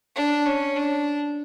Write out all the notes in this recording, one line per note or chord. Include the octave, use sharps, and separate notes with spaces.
D4
C#4
D4